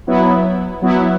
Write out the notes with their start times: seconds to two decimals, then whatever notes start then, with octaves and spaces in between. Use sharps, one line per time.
0.07 F#3 B3 E4
0.82 F#3 B3 E4